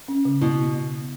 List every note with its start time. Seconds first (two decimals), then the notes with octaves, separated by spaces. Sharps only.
0.08 C#4
0.25 C#3
0.41 B2 E4